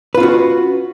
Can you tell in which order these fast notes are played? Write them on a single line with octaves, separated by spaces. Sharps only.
B4 F4 C#4 F#4